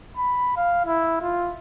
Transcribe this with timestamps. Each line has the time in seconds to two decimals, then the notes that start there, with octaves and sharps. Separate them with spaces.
0.17 B5
0.57 F5
0.86 E4
1.22 F4